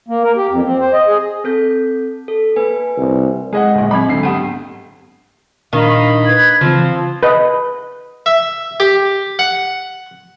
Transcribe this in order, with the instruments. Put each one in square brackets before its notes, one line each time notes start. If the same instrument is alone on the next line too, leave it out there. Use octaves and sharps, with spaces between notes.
[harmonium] A#3
A#4
G4
F2
C4
C5
D#5
G#4
[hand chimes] C4 A4 G6
A4
A#3 B4 G#5
[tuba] C2
[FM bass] G#3 [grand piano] G#4 D#5 F#5
[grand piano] D1 A#1
[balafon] F#3 C4 [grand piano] B5
[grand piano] D2 C7 [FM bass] G#2
[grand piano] G1 [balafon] G4 F#5 G5
[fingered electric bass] A#2 D4 [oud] D#3 [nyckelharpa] D#5 B5 [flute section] F5
[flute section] B4 G#6
[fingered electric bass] C#3 E3 [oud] F3 [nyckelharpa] C4 [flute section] F4
[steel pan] B4 D#5
[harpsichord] E5
G4
F#5